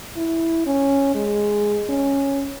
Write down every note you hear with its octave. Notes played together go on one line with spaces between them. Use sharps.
E4
C#4
G#3
C#4